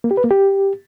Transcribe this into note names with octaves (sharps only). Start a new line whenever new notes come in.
A#3
G4
B4
A#3
G4